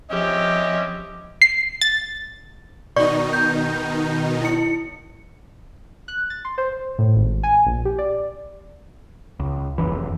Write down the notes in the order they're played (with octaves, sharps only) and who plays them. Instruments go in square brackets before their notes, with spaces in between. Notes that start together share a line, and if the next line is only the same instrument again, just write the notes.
[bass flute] F3 [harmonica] C4 C#4 E5 [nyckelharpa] G4 [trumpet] D#5
[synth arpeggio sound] C7
A6
[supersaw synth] B2 D#3 D#4 [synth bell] D5 C#6
[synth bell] G6
E4 C#7
[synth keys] F#6
A6
C6
C5
A2
G#1
G#5
A#1
G4
D5
[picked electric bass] C#2
F1 F#2 E3